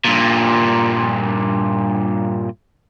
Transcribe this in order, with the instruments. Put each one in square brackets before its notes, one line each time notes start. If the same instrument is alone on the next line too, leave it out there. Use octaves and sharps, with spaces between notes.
[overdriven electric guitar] G2 A#2